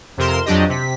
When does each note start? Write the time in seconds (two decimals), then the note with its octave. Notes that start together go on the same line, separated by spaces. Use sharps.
0.17 F2 C3 A#4 C6 E7
0.46 F2 F#3 D4 G4 D#5
0.69 C3 B6